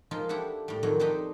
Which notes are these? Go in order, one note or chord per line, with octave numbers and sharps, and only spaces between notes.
F3 G#3 A#3 D#4 F4
D4 E4 G4 A4 E5 F#5
A2 G3
F2 A#2 D#3 F#3
D#4 G4 A4 B4 C5 D5